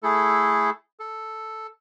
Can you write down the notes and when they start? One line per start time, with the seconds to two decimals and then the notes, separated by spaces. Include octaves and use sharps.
0.03 A3 E4 G#4 A4
1.00 A4